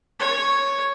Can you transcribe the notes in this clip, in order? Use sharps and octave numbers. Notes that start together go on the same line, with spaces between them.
C#5